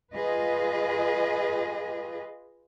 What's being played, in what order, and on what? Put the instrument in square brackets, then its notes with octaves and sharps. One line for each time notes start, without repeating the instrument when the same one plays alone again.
[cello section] F4 G#4 B4 D#5